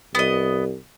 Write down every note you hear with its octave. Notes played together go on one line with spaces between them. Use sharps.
C2 B3 D#5